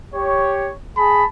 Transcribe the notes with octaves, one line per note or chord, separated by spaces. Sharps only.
G4 C#5
G#4 A5 B5